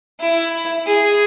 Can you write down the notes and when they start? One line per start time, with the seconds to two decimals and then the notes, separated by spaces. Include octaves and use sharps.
0.20 E4
0.87 G#4